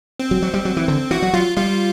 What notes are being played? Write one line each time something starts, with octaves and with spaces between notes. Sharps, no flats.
C4
F#3
F#3
G3
F#3
E3
D3
E3 F#4
F#3
F#3 F4
G3 F4